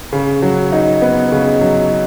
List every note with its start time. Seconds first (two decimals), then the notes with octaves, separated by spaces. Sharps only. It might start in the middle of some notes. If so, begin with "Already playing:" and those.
0.13 C#3
0.42 F#3
0.72 D#4
1.02 B3
1.32 C#3
1.61 F#3